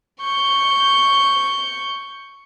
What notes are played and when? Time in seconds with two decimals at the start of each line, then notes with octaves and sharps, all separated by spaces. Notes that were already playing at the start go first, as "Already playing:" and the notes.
0.21 C#6 G6